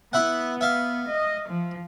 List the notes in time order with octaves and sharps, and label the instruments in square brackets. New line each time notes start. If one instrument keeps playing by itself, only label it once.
[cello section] B3 [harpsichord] E4 E5 F#5
[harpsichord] E5 F5
[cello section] D#5
F3